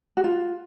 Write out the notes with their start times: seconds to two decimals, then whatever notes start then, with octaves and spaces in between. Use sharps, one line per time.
0.17 F#4
0.24 F4